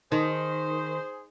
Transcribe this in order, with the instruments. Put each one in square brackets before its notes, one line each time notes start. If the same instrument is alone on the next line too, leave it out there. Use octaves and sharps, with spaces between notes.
[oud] D#3 [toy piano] D#4 [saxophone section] G#4 C5